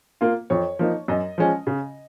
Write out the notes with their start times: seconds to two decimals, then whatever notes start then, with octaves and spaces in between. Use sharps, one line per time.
0.21 A#3 F4
0.50 F2 C#5
0.79 F3 A#3 D#4
1.08 F#2 D#5
1.38 F3 G#3 C#4
1.67 C#3